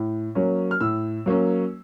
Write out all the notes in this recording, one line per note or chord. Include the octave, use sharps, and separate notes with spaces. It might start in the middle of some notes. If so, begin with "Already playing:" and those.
Already playing: A2
F#3 A#3 C#4
F6
A2 E6
F#3 A#3 C#4